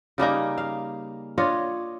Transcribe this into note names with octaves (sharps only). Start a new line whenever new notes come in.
C#3 G3 A#3 D#4
F5
D4 F4 C#5 D#5